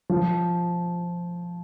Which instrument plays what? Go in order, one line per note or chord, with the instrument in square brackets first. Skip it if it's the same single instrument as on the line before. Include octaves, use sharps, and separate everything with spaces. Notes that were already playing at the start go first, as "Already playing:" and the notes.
[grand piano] F3